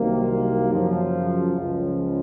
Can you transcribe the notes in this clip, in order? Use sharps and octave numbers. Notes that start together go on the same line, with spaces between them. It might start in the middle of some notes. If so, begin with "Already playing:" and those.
Already playing: C2 C3 D#3 F#3 A#3
F#2 C#3 F3
C#2 C#3 F3